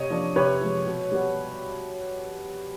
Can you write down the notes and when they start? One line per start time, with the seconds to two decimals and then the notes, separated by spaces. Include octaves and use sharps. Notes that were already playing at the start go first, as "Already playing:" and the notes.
Already playing: C3 C#5 D#5
0.10 F3 A#3 D4
0.36 C3 B4 C#5
0.61 F3 G#3
0.87 B2
1.12 G3 B3